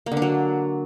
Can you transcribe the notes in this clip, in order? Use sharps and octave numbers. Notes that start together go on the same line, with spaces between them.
A#3
D3
D4
F#3